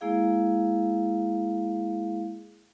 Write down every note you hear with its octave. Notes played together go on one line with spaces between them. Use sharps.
G#3 A#3 E4 G#4 F5